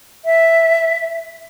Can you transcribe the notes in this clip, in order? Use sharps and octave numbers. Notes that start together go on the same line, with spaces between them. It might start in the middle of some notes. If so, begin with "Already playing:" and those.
E5